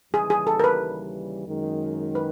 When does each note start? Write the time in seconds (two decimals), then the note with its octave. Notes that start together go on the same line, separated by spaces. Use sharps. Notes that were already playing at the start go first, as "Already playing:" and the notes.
0.13 D#2 C#3 E3 G3 G#4
0.30 G#4
0.47 A4
0.60 A#4
0.64 B4
1.48 F#2 D#3 G#3
2.15 B4